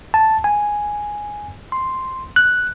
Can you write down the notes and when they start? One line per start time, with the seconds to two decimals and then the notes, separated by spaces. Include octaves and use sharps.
0.14 A5
0.44 G#5
1.72 C6
2.36 F#6